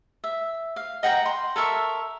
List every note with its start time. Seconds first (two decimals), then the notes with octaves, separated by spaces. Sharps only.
0.24 E5
0.76 F5
1.03 D#5 F#5 G5 A#5
1.26 C6
1.56 A4 A#4 E5 C#6